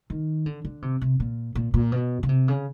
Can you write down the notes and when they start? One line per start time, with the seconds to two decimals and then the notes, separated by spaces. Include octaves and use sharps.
0.10 D#3
0.46 D3
0.65 D3
0.82 C3
1.01 C3
1.20 A#2
1.55 A#2
1.74 A#2
1.92 B2
2.23 C#3
2.29 C3
2.48 C#3